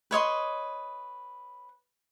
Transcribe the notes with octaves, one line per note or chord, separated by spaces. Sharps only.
B4 C#5 D#5 C6